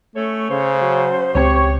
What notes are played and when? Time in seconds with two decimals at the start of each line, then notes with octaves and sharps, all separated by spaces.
0.16 A3 C#4 A4 C#5
0.50 C#3 C5
0.80 F#3
1.35 C#2 G3 C4 G4 C#5